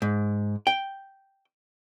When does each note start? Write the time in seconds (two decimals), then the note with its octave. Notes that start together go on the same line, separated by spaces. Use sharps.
0.02 G#2
0.67 G5